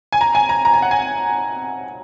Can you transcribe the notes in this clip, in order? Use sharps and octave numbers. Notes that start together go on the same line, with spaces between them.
G#5
A#5
G#5
A#5
A#5
G#5
F#5
G#5